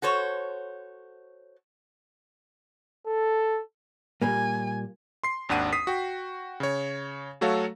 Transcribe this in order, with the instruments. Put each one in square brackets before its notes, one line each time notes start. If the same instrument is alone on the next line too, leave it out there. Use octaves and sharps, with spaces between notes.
[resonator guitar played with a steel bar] F#4 A4 C5 C#5
[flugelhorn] A4
[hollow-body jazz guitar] A#2 G3 A#3 [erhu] G#5
[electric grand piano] C6 C7
G#1 D#2 D4 F#5 D#7
D#6 B6 C7
F#4 G5
C#3 C#5
F#3 A3 F#4 A4 C#5 F5